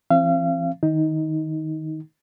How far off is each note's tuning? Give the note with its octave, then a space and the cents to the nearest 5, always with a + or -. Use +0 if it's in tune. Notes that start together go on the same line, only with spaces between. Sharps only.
E3 +40 C4 +30 F5 -35
D#3 +0 D#4 +15